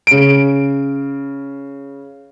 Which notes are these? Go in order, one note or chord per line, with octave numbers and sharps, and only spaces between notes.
C#3 D7